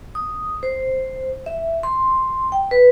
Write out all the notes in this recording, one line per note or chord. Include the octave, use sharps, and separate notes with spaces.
D#6
C5
E5
C6
G5
B4